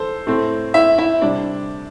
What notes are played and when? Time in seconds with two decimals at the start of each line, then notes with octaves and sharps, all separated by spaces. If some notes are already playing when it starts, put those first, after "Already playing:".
Already playing: E3 A4 C5
0.27 A2 A3 C4
0.74 E4 E5
0.98 E4 E5
1.22 C3 G3 D4 D5